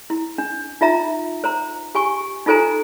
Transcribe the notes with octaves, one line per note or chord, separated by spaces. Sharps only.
E4
D4
D#4 F4 E5 A#5
C5 A#5
G4 G#5 C#6
D#4 F4 A4 C5 G#5 A#5